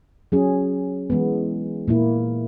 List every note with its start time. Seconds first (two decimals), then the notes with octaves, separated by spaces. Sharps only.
0.32 F#3 C#4 G#4
1.10 E3 G#3 B3
1.88 A#2 A#3 E4